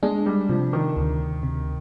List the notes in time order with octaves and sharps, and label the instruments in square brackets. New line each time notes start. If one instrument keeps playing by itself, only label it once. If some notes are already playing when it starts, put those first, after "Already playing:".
[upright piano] G#3 [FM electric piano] D4
[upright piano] G3
[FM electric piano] C3 [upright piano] F3
[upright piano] D#3
[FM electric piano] D2
C3